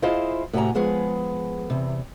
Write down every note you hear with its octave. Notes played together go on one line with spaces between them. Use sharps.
E4 F4 G#4 C5 D#5 F5
A2 C3 F#4 G4 G#5 A#5
F3 G#3 B3 G#4
E2 C3